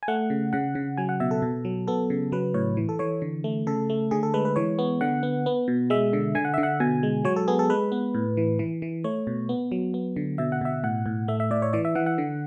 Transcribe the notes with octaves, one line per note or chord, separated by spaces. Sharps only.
G#5
A3 F#5
C#3
C#3 F#5
C#3
F#3 G#5
F#5
B2 E5
A4
B2
F#3
B3 A4
C#3
F#3 B4
A2 C#5
E3
A4
E3 C#5
D3
A3
C#3 A4
A3
D3 G#4
A4
G#3 B4
B4
E3 C#5
B3
D3 F#5
B3
B3
B2
G#3 E5
D3
D3 G#5
F#5
D3 E5
F#5
B2 G#5
G#3
F#3 C#5
A4
B3 G#4
A4
G#3 B4
B3
A2
E3
E3
E3
A3 C#5
B2
B3
F#3
B3
D3
B2 E5
F#5
B2 E5
A2 F#5
A2
A3 E5
E5
A2 D5
C#5
E3 D5
E5
E3 F#5
F#5
D3